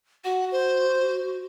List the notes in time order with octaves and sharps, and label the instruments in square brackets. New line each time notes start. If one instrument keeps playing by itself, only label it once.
[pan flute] F#4 [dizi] F#5
[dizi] C5